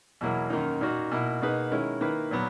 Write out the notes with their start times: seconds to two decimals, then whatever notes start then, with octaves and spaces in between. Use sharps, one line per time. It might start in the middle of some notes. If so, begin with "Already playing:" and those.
0.21 E2 B2 F#3 A#3 E4
0.50 F#2 D#3 A#3 D#4
0.81 A#2 A#3 D#4 F#4
1.11 B2 A#3 E4
1.41 B2 A#3 D#4 G#4 B4
1.72 D#3 G#3 C#4 E4 A#4
2.01 D#3 A#3 E4 B4
2.31 A#2 F#3 B3